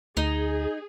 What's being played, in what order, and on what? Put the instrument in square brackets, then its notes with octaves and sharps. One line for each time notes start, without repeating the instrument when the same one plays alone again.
[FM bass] D2 [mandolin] D#4 [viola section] G#4